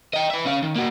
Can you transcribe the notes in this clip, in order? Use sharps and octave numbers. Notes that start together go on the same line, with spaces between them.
D#5 G5
B4 E5
C#4 F5
D#3
A#3 F#4